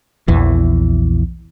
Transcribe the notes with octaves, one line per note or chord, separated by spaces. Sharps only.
A#1 E2 E3